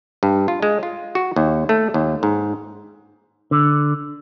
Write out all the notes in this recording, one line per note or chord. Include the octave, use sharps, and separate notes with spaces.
G2
F4
G#3
F4
F#4
D#2
A3
D#2
G#2
D3